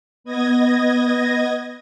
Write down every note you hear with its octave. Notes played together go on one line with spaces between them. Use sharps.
B3 D#5 G#6 A#6